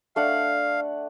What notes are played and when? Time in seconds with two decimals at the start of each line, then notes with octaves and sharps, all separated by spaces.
0.16 A3 D4 F5 F#5